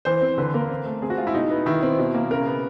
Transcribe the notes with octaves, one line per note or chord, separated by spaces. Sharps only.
E3 C5
C4
D3 B4
A#3 A#4
C4
A3
C4 G#4
F#4
G#3 F4
E4
B2 D#4
B3
D#3 E4
C4
B2
A#3
C#3 A#4
B3